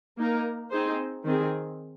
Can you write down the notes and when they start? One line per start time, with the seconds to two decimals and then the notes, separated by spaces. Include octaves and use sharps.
0.18 A#3 D#4 A#4
0.71 C4 D#4 G#4 C5
1.24 D#3 C4 G#4